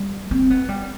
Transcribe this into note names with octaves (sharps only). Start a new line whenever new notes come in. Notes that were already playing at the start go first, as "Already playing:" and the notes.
Already playing: G3
C4
B3
G3